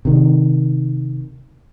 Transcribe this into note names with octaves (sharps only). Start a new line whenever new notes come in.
C3 D#3